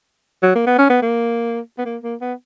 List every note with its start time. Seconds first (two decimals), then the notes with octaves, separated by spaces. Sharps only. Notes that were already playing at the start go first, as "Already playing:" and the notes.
0.43 F#3
0.55 A#3
0.66 B3
0.78 C#4
0.90 B3
1.02 A#3
1.78 B3
1.85 A#3
2.03 A#3
2.21 B3